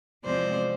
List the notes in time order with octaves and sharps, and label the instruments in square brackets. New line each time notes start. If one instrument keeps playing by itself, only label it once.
[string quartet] E2 C3 F3 G#3 C4 C5 D5